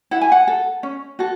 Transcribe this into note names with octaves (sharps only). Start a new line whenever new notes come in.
E4 F#5
G#5
F#5
A4
C#4
F#4 A4